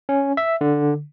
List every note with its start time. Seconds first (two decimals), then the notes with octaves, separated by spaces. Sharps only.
0.09 C#4
0.37 E5
0.61 D3